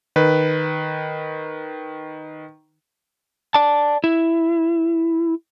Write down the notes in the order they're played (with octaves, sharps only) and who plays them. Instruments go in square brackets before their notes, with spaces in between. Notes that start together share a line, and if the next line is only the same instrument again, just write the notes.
[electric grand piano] D#3 B4
[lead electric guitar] D5 A5
E4